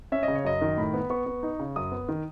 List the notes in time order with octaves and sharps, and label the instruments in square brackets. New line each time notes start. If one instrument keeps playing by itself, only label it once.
[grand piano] C#4 E5
D#5
C#3
C#5
F#2 D#5
D#3
A2 B5
B3
B3 C#6
B3
D#4
C#3
F#2 D#6
B3
D#3